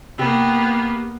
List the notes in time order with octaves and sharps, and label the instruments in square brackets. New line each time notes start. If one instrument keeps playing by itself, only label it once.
[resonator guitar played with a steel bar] C3 G4 [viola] A#3 B3